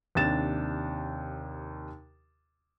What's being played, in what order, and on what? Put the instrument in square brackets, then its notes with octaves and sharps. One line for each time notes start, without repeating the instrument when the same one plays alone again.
[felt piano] D#2 C3 D4 A6 E7